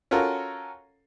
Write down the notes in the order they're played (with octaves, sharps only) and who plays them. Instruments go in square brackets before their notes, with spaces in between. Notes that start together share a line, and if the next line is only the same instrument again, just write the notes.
[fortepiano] C#4 F4 F#4 A4 A#4